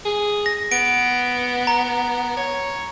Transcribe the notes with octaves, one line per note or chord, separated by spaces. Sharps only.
G#4
A#6
B3 D7
A#5
C#5